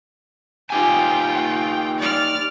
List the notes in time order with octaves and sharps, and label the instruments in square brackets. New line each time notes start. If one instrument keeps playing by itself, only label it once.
[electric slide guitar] D#4 G4 G#5 [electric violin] F4 G5
[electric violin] D5 F6